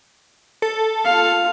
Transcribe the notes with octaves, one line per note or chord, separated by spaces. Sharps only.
A4
F4 F5